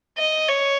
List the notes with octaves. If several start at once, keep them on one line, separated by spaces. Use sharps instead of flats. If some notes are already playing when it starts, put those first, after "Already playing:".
D#5
C#5